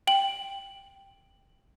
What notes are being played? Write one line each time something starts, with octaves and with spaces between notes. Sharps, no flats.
G5 F#7